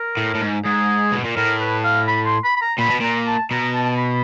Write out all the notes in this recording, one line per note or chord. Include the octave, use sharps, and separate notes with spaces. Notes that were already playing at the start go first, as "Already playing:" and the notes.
Already playing: A#4
A2
A2
G#2
G#2 G#4
B2
A#2
A2 A#4
B4
F5
B5
C6
B5
B5
A#5
A#2 B5
B2
A#2 A#5
A5
B2 A#5
A5
B5